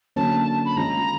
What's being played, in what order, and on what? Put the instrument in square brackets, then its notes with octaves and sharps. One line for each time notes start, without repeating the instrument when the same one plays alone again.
[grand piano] D3 F#3 A#3 C#4 [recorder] A5
[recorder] B5
[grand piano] D#3 G#3 C#4 F4 G#4 [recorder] A#5